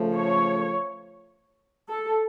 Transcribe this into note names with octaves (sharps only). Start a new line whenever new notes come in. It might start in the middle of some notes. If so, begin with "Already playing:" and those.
Already playing: C#3 F3 A3
C#5
A4